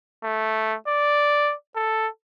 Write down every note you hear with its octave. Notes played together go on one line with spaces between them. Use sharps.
A3
D5
A4